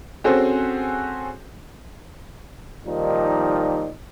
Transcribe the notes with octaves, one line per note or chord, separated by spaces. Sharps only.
C4 C#4 F#4 G#4 A4 C5
A#2 D#3 F3 G3 D#4